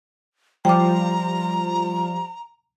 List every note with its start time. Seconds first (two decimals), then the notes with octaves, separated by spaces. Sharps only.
0.65 F3 G3 F4 G5 A#5 D6